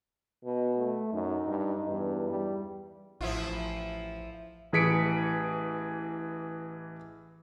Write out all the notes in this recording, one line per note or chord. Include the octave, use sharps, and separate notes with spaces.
B2
A3
F#2 D#4
G2
E2 G2
G3
A1 F3 E4 F4
A1 E3 G#4 B6 C#7 D7